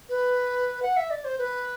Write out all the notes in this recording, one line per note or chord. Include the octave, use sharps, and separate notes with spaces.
B4
F#5
E5
D5
C5
B4